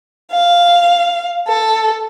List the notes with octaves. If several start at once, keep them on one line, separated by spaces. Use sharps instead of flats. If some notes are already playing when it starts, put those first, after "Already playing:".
F5
A4